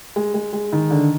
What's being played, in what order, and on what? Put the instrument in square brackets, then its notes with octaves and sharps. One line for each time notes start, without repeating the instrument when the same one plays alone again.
[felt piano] G#3
G#3
G#3
D#3
D3